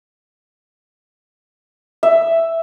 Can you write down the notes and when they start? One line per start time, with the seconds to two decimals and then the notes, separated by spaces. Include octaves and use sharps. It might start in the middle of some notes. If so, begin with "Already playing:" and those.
2.03 E5